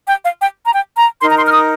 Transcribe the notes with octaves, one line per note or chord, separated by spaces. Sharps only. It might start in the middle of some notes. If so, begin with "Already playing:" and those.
G5
F5
G5
A#5
G5
A#5
D#4 A#4 C6
A#5
C6
F6
D#6